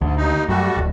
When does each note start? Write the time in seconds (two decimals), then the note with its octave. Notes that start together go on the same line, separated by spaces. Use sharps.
0.01 D2 G#2
0.17 D#2 D#4
0.49 F#2 G3 A3 F#4
0.77 D1